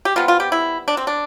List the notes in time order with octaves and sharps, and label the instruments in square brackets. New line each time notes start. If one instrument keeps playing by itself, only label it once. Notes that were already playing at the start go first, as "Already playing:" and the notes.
[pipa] G4
C3 G3 B3 F4
F4
G4
E4
D4
C4
D4